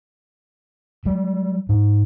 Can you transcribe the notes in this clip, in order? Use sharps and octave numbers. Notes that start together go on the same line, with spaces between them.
F#3 G3
G#2